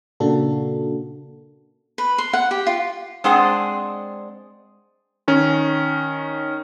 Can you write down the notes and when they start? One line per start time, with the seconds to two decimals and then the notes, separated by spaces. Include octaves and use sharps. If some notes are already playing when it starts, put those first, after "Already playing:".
0.20 A#2 C#3 A#3 D4 F#4 A4
1.98 B4
2.18 C6
2.33 F#5
2.51 G4
2.67 F4
3.24 G#3 C4 D4 G#4 C5 F#5
5.28 D#3 C#4